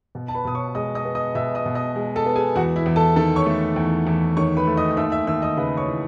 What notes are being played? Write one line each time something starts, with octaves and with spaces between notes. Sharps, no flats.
B2
A5
B4 B5
B2 D#6
C#5 C#6
G#3 D#5 D#6
D#5 D#6
B3
D#5 D#6
B2 E5 E6
D#5 D#6
B2
D#5 D#6
G#3
A4 A5
B3
G#4 G#5
E2 F#4 F#5
E4 E5
E2
A4 A5
D#3 A4 A5
C#5 C#6
A3
E2
E2
D#3 C#5 C#6
B4 B5
A3
D#5 D#6
D#6
D#2 E5 E6
E5 E6
D#2 E5 E6
D#5 D#6
C#3 B4 B5
C#5 C#6
E3